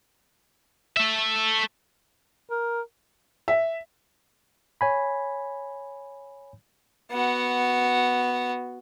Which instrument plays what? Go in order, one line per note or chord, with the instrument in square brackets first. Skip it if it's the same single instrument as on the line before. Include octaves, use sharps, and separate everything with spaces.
[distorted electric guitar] A3 E5
[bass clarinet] A#4
[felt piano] E5
[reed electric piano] C#5 G#5 B5
[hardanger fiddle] B3 F#4